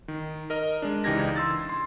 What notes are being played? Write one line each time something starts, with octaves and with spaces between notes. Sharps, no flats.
D#3
A#4 D#5 F6
G#3 D4
C#2 E3 D#4 G4 G#6 A#6
C6 E6 A6
C6